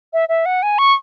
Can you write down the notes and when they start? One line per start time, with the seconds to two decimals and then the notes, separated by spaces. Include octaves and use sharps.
0.13 E5
0.29 E5
0.46 F#5
0.63 G#5
0.78 C#6